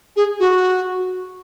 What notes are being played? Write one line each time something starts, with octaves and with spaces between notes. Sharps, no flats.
G#4
F#4